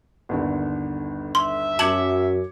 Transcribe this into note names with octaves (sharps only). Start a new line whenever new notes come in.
G1 D#2 D3
E5 C6
F#2 A5 D6 G#6 C#7 F#7